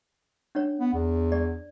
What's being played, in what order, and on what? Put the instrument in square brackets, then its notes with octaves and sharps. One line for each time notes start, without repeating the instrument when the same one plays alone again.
[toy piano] C#4 D4 C#5
[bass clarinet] B3
E2
[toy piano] D5